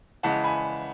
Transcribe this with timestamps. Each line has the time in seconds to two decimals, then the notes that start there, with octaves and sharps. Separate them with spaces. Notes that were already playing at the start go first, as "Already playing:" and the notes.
0.23 C#3 E3 G#3 F#5 A5
0.44 G#5 B5